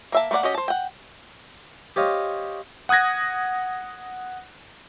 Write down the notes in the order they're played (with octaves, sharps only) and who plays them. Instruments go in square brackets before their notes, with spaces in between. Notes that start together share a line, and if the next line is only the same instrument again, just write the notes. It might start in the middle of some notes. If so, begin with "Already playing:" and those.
[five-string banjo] A#3 E5 A5
A3 A#3 F4 D5 F#5
C#4 F#4 G4 D#5
C5 A5
F#5 G5
[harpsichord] G4 C5 C#5 D#5 F5
[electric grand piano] F#5 D#6 F#6 G#6 A#6